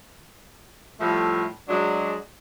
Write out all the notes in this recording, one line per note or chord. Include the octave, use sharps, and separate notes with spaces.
A2 F3 G3 A3
F#3 G#3 D4